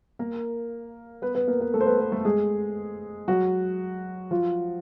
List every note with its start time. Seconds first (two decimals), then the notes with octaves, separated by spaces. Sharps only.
0.19 A#3 A#4
1.22 B3 B4
1.35 B3 B4
1.48 A#3 A#4
1.60 B3 B4
1.74 A3 A4
1.81 C5
1.86 B3 B4
2.00 B3 B4
2.12 A3 A4
2.25 G#3 G#4
3.28 F#3 F#4
4.31 F3 F4